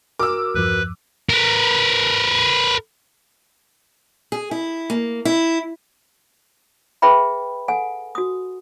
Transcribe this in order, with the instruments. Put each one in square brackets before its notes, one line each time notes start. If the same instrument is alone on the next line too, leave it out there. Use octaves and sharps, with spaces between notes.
[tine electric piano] F#4 A#4 F6 [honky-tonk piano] D6 E6
[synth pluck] E2 G2 F3 [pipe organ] B4
[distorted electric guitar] A#4 B4
[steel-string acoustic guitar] G#4
E4
A#3
E4
[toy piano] G#4 B4 E5 G5 B5
A4 F#5 G#5
F#4 D#6